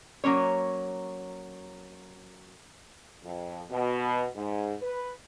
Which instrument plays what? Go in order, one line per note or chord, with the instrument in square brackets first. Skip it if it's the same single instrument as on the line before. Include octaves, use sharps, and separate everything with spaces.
[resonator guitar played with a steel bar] F#3 A#3 C#4 C#5
[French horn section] F2
B2
G#2
B4